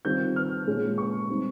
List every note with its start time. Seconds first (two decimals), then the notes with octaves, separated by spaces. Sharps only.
0.05 D#3 G3 C4 F4 G6
0.36 F6
0.67 A#2 G#3 C#4 F4
0.98 C#6
1.29 G3 C4 D#4